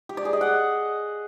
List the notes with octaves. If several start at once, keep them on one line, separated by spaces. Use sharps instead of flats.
G4
D5
G#4
D#5
F#5